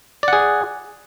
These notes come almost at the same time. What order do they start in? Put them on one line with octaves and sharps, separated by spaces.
D5 F#5 G#4